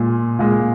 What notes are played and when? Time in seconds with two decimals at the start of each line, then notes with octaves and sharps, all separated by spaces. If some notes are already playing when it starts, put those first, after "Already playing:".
Already playing: A#2 G#3
0.39 A#2 G#3